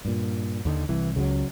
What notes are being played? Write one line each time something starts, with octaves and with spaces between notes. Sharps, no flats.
G2 A#2
D#2 D3 D#3
C2 E3
C#2 C#3 F3 F#3